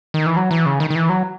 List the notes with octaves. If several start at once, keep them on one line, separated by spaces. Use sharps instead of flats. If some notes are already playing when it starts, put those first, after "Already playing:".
D#3
E3
F#3
E3
C#3
D#3
D#3
E3
F#3